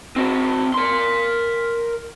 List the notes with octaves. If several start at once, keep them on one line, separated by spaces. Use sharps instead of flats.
C4 F#4
A#4 C6